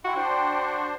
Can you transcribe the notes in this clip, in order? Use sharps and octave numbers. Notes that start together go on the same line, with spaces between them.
E4 F#4 G5 C6
D4 F#4 C5